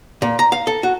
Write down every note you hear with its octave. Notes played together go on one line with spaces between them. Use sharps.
A#2
A#5
F5
A4
F#4